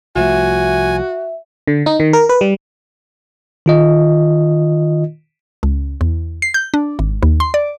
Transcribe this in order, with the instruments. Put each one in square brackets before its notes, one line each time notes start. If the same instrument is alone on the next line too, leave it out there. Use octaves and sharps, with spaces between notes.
[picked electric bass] C2 F3 A3 [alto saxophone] F#4 [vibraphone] E5 [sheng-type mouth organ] G#5
[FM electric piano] D3
D#4
D#3
A#4
B4
G3
[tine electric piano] D#3 F4 D#5
[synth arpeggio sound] C#2
E2
C7
G6
D4
G#1
D#2
C6
D5